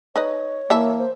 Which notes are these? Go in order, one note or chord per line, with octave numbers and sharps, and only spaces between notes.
D#4 B4 C#5 D#5
E3 A#3 E5 A5
C5